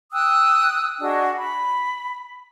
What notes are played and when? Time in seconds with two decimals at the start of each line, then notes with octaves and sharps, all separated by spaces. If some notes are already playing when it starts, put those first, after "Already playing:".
0.12 G5 D#6 E6 F#6
1.00 D4 F#4 G#4 D#5
1.35 B5